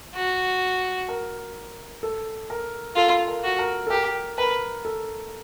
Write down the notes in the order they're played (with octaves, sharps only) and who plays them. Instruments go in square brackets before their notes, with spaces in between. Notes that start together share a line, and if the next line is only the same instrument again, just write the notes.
[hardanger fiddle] F#4
[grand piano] A#4
A4
A#4
[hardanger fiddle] F4 [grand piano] A4
[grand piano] A#4
[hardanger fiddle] F#4
[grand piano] A#4
A4
[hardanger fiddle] G4 [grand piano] A#4
[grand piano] A#4 [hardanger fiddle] B4
[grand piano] A4